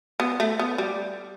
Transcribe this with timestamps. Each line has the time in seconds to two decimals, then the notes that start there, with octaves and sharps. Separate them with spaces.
0.20 B3
0.40 A3
0.59 B3
0.78 G3